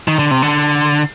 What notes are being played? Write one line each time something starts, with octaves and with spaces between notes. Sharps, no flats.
D#3
D3
C3
D3